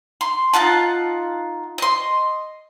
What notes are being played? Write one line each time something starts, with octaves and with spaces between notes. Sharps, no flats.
C6
D#4 F4 F#5 A5
D#5 C6